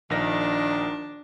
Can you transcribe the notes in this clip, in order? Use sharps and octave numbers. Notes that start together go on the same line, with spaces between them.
A#1 D#3 D4 A#4 A#6